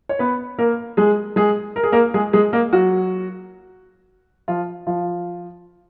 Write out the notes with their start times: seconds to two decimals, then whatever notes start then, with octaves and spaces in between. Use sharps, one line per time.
0.09 C#5
0.19 B3 B4
0.59 A#3 A#4
0.97 G#3 G#4
1.36 G#3 G#4
1.76 A#4
1.83 G#4
1.92 A#3 A#4
2.14 G#3 G#4
2.33 G#3 G#4
2.53 A#3 A#4
2.73 F#3 F#4
4.48 F3 F4
4.87 F3 F4